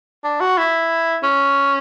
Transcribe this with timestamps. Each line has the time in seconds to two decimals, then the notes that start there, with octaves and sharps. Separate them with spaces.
0.24 D4
0.40 F#4
0.58 E4
1.23 C#4